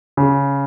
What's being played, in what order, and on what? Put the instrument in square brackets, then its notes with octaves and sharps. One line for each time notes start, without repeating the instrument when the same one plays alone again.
[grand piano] C#3